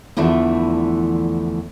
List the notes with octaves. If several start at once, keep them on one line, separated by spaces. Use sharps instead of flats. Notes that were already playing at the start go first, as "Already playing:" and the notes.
E2 D3 E3 F3 A3 D4